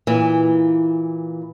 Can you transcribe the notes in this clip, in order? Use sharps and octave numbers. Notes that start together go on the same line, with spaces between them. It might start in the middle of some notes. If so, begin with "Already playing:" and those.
A#2 E3